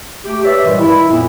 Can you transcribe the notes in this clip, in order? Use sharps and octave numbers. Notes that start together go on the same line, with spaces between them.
A3 G4
B4 C#5 D5 E5
G2 A#2 D#3 E3 G3 G#3
E4
F2 A#2 F#3 B3 E4